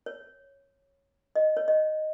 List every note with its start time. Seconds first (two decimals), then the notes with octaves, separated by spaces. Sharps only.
0.06 C#5
1.36 D#5
1.57 C#5
1.68 D#5